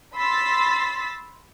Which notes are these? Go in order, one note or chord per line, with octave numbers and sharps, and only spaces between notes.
B5 C6 E6 A6 B6